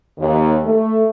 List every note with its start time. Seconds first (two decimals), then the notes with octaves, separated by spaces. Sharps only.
0.18 D#2
0.64 A3